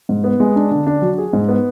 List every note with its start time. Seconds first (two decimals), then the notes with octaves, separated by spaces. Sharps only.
0.09 G#2
0.24 B3
0.40 G#3
0.56 D4
0.71 D3
0.87 D4
1.02 F#3
1.18 G#4
1.33 G#2
1.49 B3